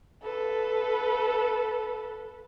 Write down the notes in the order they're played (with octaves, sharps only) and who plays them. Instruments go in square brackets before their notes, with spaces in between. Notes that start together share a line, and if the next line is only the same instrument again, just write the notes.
[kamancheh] A4 B4